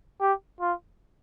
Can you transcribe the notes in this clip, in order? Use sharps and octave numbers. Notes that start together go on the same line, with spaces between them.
G4
F4